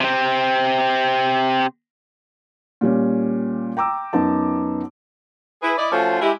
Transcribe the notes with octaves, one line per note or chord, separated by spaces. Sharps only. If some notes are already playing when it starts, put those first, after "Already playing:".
C3 C4
A#2 G3 C#4
G5 A#5 D6 E6
F#2 B3 D#4 A5
E4 G#4 B4
E4 D5 D#5
F3 A3 C#4 F4 F#4 C5
G#3 E4 G4